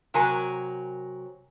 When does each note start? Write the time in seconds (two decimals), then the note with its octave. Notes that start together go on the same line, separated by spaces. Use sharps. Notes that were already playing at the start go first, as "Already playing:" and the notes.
0.14 C3 F#3 A#4 G#5